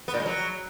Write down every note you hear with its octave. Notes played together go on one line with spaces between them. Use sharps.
B3
A#2
G#3
F#3